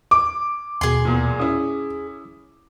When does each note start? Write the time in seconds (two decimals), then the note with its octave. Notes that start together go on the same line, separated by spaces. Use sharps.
0.11 D6
0.81 D#2 B2 G#4 C6
1.05 E2 A#2
1.40 C#4 E4 D#6